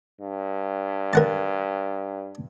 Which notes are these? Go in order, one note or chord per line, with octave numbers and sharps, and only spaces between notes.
G2
A#4 F#5 A5